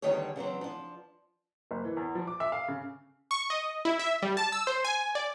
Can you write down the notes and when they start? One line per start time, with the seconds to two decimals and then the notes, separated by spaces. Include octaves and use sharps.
0.02 E2 D3 D#3 G3 G#4 C#5
0.36 C#3 E3 F#3 C4
0.61 F3 D4
1.71 F#1
1.85 E3
1.97 E2
2.15 F3
2.27 D6
2.40 E5
2.52 F5
2.68 C#3
3.31 C#6
3.50 D#5
3.85 E4
3.99 E5
4.22 G3
4.37 A5
4.52 E6
4.67 C5
4.84 G#5
5.15 D5